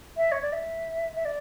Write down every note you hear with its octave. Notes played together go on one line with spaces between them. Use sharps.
E5
C#5
D5
E5
E5
D5